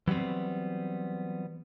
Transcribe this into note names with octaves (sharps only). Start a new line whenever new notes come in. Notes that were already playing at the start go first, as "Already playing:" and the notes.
E3 F#3 G3 B3 C4